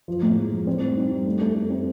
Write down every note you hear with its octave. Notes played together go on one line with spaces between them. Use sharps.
F3
A2
G#3
F3
C4
G3
D#4
G3
A3
A3
A3
C4